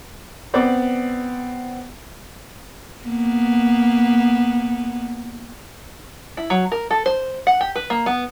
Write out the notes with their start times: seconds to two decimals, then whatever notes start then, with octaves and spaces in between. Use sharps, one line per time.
0.54 B3 C4 D5
3.04 A#3 B3
6.37 E4
6.50 F#3
6.72 A#4
6.91 A4
7.06 C5
7.47 F#5
7.61 G4
7.76 B4
7.90 A#3
8.06 B3